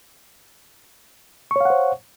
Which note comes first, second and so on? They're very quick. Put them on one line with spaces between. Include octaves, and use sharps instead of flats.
C#6 C#5 F5 F#5 C5